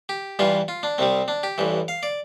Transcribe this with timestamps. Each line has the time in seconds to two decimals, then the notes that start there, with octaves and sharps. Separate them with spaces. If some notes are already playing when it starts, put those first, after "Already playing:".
0.09 G4
0.39 G2 E3 G3 F4
0.68 F4
0.83 D4
0.98 C2 C3 G3 C4
1.28 D4
1.43 G4
1.58 A1 G2 E3
1.88 F5
2.03 D5